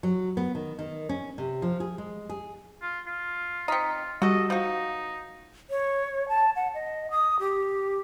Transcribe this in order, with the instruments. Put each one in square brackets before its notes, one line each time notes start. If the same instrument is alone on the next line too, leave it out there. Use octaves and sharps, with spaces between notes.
[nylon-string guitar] F#3
B3
D#3
D#3
C#4
C3
F3
G#4
G#3
G#4
[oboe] F4
F4
[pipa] C4 D#4 [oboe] F4 [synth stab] D#6 B6 C#7
[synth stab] G3 [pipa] F#4 A4 [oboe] D#5
[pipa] F3 F#4 [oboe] D#4
[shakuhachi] C#5
A5
F#5
D#5
D#6
G4